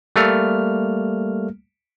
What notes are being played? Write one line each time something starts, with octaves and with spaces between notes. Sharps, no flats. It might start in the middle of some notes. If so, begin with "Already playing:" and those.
G3 A3 A#3 F6